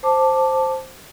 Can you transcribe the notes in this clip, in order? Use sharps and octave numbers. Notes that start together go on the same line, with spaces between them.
C5 A5 D6